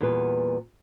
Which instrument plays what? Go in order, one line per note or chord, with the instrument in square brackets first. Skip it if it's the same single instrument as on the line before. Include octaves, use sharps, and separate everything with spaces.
[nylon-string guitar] E2 A#2 G3 B3 B4